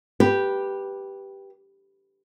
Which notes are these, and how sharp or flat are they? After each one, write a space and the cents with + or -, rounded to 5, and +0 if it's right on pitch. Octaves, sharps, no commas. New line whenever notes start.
G4 +0 B4 -10